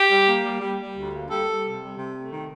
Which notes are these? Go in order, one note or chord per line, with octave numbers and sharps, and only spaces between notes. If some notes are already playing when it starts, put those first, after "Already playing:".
Already playing: G4
G3
A#3
G3
G3
G3
D2
A#3
G3 A4
G3
C3
G3
C3
A3
D#3